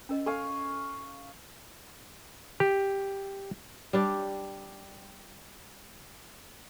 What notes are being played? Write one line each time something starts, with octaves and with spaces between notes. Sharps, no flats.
C#4 A#4 D#5
A4 F5 G#5 C#6
G4
G3 D4 G4